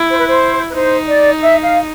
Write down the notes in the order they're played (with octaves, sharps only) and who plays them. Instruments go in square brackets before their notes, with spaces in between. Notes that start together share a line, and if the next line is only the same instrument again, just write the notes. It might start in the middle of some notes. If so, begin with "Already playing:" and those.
Already playing: [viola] E4
[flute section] C5
B4
C5
B4
[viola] D#4 [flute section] C5
[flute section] D5
E5
F5